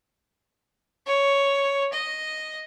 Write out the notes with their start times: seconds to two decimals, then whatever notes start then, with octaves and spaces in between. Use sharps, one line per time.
1.06 C#5
1.92 D#5